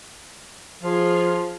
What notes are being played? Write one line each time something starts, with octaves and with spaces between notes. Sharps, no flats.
F3 F4 G#4